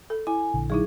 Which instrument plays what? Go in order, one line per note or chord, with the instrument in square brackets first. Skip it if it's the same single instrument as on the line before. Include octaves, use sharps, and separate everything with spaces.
[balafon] A4
[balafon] E4 [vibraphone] G#5
[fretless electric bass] A#1 D3
[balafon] F#3 D#4 E4 [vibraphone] G#4